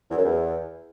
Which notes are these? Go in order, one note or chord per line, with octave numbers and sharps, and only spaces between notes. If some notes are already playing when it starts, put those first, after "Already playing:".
E2
F#2
E2